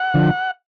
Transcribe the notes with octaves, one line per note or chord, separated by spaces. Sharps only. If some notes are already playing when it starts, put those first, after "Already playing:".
Already playing: F#5
D3 F3